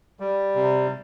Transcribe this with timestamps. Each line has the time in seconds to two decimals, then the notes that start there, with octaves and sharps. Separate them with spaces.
0.20 G3
0.55 C3